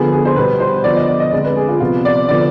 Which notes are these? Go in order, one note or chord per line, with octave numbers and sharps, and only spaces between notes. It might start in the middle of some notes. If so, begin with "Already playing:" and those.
Already playing: D3 F3 B3 G#4
G#4
C5
B2 G3 B3 B4
C5
D3 F3 B3 D5
D#5
D5
D#5
D3 G#3 C4 D5
B4
G#4
F4
C3 F3 B3 F4
D5
D3 F3 B3 D5